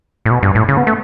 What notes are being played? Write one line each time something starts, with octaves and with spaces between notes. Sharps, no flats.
A2
B2
G2
A2
C#3
B3
A3